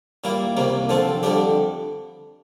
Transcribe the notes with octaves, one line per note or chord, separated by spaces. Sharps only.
A#2 G3 A#3 E4
C2 C3 G3 A#3
D3 F3 C4 F4 A4
F2 D3 G3 D4 G4